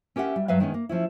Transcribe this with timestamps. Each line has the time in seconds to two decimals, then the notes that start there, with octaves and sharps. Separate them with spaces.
0.16 C#4 G4 A#4 E5 F#5
0.36 G3
0.48 G2 F#3 B4 E5 F5
0.60 D#3 G#3 B3 C#4
0.74 A#3
0.89 F3 C#4 E4